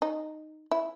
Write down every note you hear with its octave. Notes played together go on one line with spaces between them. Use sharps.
D#4
E4